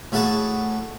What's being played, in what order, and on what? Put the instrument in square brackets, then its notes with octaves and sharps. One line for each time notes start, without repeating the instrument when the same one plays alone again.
[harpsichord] A2 F#4 G#4 F#5 A5 C#6